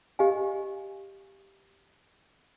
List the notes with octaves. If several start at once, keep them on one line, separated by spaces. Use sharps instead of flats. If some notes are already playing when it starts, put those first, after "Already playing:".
G4 D#5 F5 G#5